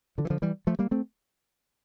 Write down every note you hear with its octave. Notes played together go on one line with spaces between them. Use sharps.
D3 F3
E3
D3 F3
E3 G3
F3 A3
G3 A#3
A3 C4